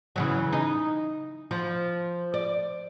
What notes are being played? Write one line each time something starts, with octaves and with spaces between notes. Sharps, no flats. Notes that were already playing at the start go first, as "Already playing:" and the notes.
C#3 E3 F#3
D#4
F3
D5